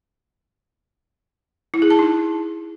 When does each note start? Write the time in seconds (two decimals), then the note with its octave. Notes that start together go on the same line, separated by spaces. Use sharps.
1.74 E4
1.82 G#4
1.90 A5
1.99 D#4